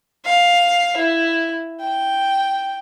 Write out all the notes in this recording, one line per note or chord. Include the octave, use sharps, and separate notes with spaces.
F5
E4
G5